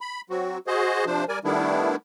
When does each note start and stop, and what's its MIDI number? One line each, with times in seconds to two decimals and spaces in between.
0.01 0.21 83
0.30 0.58 54
0.30 0.58 60
0.30 0.58 66
0.67 1.05 66
0.67 1.05 68
0.67 1.05 72
0.67 1.05 75
1.06 1.25 48
1.06 1.25 53
1.06 1.25 62
1.06 1.25 72
1.29 1.39 55
1.29 1.39 70
1.29 1.39 74
1.29 1.39 80
1.44 1.96 51
1.44 1.96 55
1.44 1.96 57
1.44 1.96 59
1.44 1.96 62
1.44 1.96 64